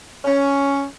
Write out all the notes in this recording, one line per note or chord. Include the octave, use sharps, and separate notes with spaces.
C#4